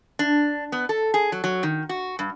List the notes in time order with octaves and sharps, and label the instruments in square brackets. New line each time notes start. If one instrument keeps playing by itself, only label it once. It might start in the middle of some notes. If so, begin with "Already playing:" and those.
[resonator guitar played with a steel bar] D4
B3
A4
G#4
F#3
F#3
D#3
F#4
G2